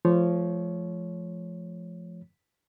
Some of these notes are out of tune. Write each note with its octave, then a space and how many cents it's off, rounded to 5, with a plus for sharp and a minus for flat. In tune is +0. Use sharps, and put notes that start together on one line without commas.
F3 -15 A3 -35 C#5 +0